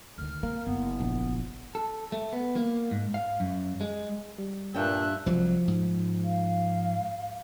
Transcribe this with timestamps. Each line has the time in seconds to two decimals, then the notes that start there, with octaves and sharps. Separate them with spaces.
0.18 D2 D#3 F6
0.43 A#3 C4
0.67 F#1 B3
1.00 A#1
1.75 A4
2.12 A3
2.33 B3
2.56 A#3
2.91 G#2
3.14 F5
3.40 F#2
3.81 G#3
4.38 G3
4.75 G2 A#2 D4 E5 G5 F#6
5.26 C2 F3 F#3
5.68 G#2
6.24 F5